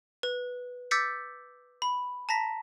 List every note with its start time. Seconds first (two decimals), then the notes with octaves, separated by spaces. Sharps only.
0.23 B4
0.91 D6 E6 G6 A6 B6 C#7
1.82 B5
2.29 A5 A#5 A#6 B6